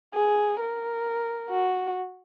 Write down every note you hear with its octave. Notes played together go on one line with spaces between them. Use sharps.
G#4
A#4
F#4